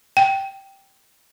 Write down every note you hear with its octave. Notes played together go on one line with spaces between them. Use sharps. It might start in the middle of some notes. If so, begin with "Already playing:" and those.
G5